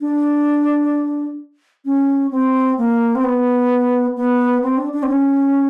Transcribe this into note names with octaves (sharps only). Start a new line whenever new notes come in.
D4
C#4
C4
A#3
C4
B3
B3
C4
D4
D4
C4
C#4